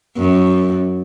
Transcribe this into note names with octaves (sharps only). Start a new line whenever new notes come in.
F#2